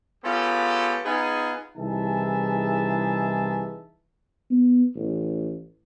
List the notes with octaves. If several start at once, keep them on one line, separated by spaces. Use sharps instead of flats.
G#3 B3 C#4 F4 G4 A4
B3 D#4 F4 G#4
C2 E3 D#4 G#4 E5 A5
B3
A1